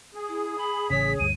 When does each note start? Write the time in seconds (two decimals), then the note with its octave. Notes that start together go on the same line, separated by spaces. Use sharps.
0.15 G#4
0.28 E4
0.57 B5
0.90 A1 C#3 C#5 B6
1.19 D2 G2 D#7